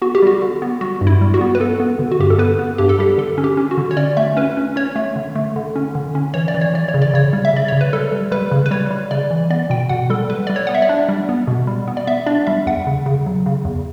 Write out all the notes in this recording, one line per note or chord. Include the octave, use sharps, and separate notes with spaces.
B3 F#4
G4
G3 F#4
D3
B3
G3 F#4
G2
E4
G3
F#4
B3
B4
B3 A4
B3
D3
F#4
G2 G4
A4
B3 B4
B3
G2 G4
A4
G3 G4
D3 A4
C#4
G4
C#4
F#4
D3
C#5
C#4 D5
A3 E5
C#4 B4
C#4
C#4 C#5
A3
D3
A3
D3
C#4
D3
C#4
E3 C#5
D5
E3
C#5
E3 D5
C#5
C#3
D5
C#3 C#5
G3
E5
C#3 D5
C#3 C#5
B4
G3 A4
G3
G3 B4
C#3
B4
G3 C#5
G3
C#3 D5
E3
B3 D5
B2 G5
B2 F#5
G3 A4
G3 B4
G3 D5
C#5
B3 F#5
E5
D5
D4
G3
B3
B2
G3
B3
D5
B3 E5
D4 D5
G3 E5
E2 F#5
C#3
C#3
F#3
C#3
E2